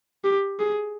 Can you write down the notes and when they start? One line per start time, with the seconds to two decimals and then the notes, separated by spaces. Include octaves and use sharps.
0.24 G4
0.60 G#4